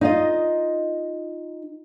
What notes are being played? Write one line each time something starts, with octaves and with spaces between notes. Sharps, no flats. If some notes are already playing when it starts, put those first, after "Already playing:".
D#4 F4 D#5